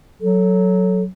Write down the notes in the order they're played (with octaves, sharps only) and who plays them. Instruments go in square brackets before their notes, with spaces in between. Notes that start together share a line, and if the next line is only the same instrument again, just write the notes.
[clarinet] F#3 [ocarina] A4